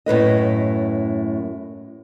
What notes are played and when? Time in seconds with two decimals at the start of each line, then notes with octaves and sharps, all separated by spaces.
0.06 F#2 A2 B4 D#5